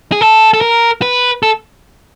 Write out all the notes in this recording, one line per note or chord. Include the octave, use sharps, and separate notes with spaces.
G#4
A4
A4
A#4
B4
A4